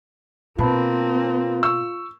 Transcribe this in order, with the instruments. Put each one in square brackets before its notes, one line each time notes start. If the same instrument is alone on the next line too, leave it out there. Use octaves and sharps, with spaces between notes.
[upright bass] B2 [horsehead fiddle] A#3 C4 [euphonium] F4 [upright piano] B4 A5 B5
[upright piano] C#6 E6